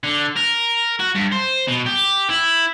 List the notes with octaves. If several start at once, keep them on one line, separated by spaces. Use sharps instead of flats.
D3
A#4
F#4
G2
C5
B2
G4
E4